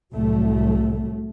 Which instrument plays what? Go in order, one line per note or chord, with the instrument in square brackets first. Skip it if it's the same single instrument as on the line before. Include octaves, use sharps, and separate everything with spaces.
[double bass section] C2 A2 F#3 A3